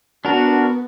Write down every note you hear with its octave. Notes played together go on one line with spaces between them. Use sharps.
B3 D4 F#4 A#4